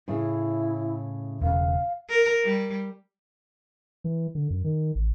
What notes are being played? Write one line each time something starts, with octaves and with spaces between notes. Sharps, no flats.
A2 C#3 E4
E1 C#3 F5
A#4
G3
E3
D3
F#2
D#3
A1